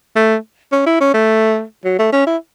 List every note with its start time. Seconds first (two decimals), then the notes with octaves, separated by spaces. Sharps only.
0.16 A3
0.72 C#4
0.86 E4
1.01 C#4
1.14 A3
1.85 F#3
1.99 A3
2.12 C#4
2.27 E4